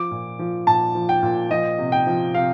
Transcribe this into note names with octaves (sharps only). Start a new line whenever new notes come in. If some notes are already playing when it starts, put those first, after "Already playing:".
Already playing: F3 D6
A#2
F3
A#2 A5
F3
G5
A#2
F3 D#5
C3
G5
F3
C3 F5